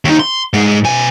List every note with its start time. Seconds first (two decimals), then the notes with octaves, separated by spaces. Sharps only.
0.05 D#2 D#4
0.19 C6
0.54 G#2 G#3
0.84 B2 G#5